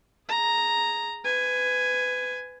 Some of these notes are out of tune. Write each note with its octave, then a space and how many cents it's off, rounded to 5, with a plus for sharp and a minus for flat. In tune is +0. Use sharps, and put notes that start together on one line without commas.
G#4 +0 A#5 +0
B4 +30 G#5 +0